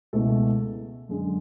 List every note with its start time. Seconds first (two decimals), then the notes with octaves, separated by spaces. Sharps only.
0.13 C#2 B2 A3 E4 A4
1.09 F#2 D3 G#3